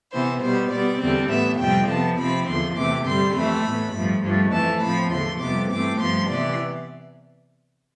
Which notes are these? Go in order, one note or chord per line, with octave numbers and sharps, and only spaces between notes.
C3 E3 B3 C5
B2 G3 B3 C5
B2 G3 B3 D5
E2 D3 G3 C4
A2 E3 B3 E5
F2 C3 G3 C4 G5
C3 F3 B3 A5
C3 F3 C4 B5
E2 D3 F3 C6
E2 C3 E3 A3 C4 D6
G2 D3 G3 C4 C6
F2 E3 A3 C4 B5
A2 E3 B3
G2 F3 A3
G2 F3 A3
F2 E3 A3 A5
A2 F3 C4 B5
E2 D3 F3 C6
F2 C3 G3 B3 D6
G2 E3 A3 C4 D6
G2 F3 B3 C6
C3 E3 B3 D5